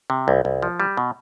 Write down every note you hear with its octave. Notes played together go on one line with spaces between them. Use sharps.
C3
C2
C2
F3
G3
B2